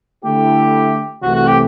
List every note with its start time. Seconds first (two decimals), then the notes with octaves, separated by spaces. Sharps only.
0.24 D3 A3 E4 G4
1.22 C2 C3 E3 A3 F#4
1.35 F#4
1.47 G4